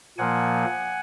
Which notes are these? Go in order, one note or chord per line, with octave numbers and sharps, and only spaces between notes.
A#2 F3 A#3 F#5 G#5